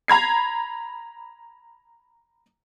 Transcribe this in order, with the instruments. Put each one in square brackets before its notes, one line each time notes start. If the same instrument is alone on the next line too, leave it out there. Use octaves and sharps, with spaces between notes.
[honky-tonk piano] A#5 B5 G#6 C7